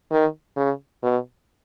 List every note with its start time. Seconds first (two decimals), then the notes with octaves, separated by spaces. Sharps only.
0.11 D#3
0.57 C#3
1.03 B2